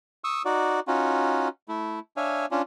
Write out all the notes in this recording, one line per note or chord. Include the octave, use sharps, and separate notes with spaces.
C#6 D#6 E6
D#4 F#4 D5
C#4 D#4 F4 F#4
A3 E4
D4 C#5 E5 F5 G#5
C#4 D4 F4